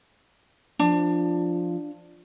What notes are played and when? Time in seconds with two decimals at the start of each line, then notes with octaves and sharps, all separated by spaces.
0.79 F3 D4